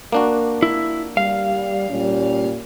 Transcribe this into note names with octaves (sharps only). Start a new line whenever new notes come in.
A#3 D4 F#4
E4
G3 F5
A#2 G3 C#4